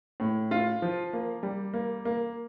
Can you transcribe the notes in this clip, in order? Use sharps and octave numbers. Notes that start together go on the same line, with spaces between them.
A2
F4
F3
A#3
G3
A#3
A#3